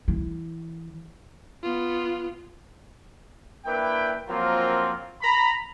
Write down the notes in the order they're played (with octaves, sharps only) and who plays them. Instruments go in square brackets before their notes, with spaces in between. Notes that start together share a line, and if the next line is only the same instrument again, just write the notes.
[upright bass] E3
[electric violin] B3 F4
[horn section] A#3 D4 E4 B4 G5
F3 F#3 A#3 C4 F4 A#4
A#5 B5